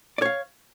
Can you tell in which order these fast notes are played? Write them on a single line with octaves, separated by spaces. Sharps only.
D5 C#5 F5